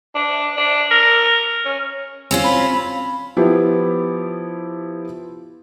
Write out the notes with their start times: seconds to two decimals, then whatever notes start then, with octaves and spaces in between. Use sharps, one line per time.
0.15 D4
0.57 D4
0.91 A#4
1.65 C#4
2.31 C4 C#4 F4
2.44 B5
3.37 F3 B3 E4 G4